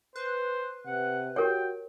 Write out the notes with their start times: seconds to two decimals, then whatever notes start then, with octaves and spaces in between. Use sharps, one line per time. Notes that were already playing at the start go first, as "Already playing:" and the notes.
0.16 B4 C5
0.87 C3 F#5
1.36 F#4 G4 A#4 C#5 G5